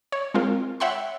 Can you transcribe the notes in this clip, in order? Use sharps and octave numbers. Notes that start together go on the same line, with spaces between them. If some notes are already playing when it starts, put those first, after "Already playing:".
C#5
G#3 C4 F4 A#4
C#5 E5 F#5 G5 B5 C6